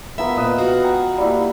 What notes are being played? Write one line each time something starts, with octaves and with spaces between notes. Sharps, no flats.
B3 F4 A#4 E5
A#2 B4 D#5
F#4 F5 F#5
G5 A#5
G3 A#3 E4